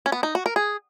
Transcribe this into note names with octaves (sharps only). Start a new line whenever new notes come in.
C#4
B3
D#4
F#4
A#4
G#4